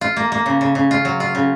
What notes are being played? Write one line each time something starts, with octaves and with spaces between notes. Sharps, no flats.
F4
A#3
A#3
C#3
C#3
C#3
F4
F#3
F4
C#3